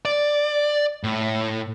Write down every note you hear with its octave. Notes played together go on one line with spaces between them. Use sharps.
D5
A2